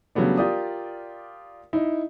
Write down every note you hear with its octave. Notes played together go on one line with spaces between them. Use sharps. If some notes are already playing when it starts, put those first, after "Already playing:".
C#3 F#3 G3 A3 B3 D4
F4 G4 A#4 D5 D#6
D#4 E4